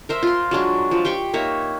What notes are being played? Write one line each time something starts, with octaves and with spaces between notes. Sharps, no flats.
A#4 C5 E5
F4 C6
F#3 G#3 D4
F3
G4 G5 C6 C#6
A#3 D#4 C#5 E5